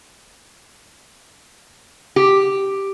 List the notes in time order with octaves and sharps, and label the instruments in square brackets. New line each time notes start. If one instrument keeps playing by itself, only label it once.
[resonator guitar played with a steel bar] G4